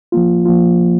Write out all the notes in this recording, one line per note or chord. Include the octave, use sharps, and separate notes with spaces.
F3 A#3 F4
F3 A#3 F4